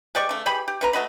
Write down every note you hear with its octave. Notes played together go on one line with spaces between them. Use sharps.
G#3 G4 D5 C#6
C#3 A3
E3 G4 G#4 B5
G4
C3 B4 A#5
A3 F#4 D#5 B5